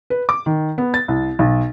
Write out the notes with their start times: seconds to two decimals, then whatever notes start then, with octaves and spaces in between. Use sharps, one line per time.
0.10 B4
0.29 D6
0.46 D#3
0.78 B3
0.94 A6
1.08 C2
1.39 B1